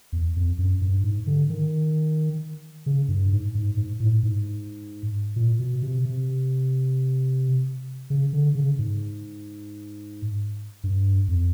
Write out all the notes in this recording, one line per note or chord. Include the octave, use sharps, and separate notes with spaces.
E2
F2
F#2
G2
G#2
D3
D#3
C#3
G2
G#2
G#2
G#2
A2
G#2
A#2
B2
C3
C3
C#3
D3
C#3
G#2
G2
F2